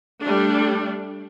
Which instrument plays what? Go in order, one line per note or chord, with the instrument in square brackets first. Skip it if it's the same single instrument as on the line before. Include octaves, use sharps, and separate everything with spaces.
[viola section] G3 A3 D4